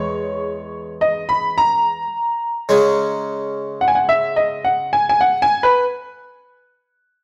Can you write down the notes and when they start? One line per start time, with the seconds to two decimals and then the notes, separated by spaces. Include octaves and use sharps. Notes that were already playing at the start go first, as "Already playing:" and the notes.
Already playing: E2 G#3 C#5
1.01 D#5
1.29 B5
1.58 A#5
2.69 C#3 G#3 C#4
3.81 F#5
3.88 G#5
3.95 F#5
4.09 E5
4.36 D#5
4.64 F#5
4.93 G#5
5.09 G#5
5.21 F#5
5.42 G#5
5.63 B4